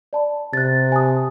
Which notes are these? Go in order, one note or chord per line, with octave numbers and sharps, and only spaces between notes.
D5 A5 B5
C3 F#6 A6
G#5 A5 D#6